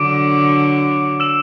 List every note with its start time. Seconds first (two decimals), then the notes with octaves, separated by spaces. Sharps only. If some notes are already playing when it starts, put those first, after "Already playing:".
Already playing: D3 F#3 D6 D7
1.20 E6 E7